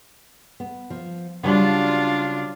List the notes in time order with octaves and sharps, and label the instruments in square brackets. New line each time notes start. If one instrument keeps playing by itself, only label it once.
[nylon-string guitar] B3
F3
[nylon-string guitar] C#3 F#3 G3 [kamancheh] D4 F4